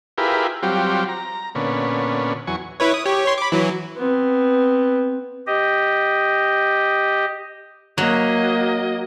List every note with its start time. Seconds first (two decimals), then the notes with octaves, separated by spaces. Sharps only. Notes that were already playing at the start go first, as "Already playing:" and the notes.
0.18 E4 F4 G4 G#4 A#4 B4
0.63 F#3 G3 C4 F4 G4
1.08 A#5
1.55 A#2 D3 B3 C#4
2.47 E2 F#3 G#5 C#6
2.80 E4 B4 C#5
2.94 D#6
3.06 G4 C#5
3.25 C#5 C6
3.38 B5 D6
3.52 E3 F#3
3.96 B3 C4
5.47 G4 D#5
7.98 F#3 A#3 D#5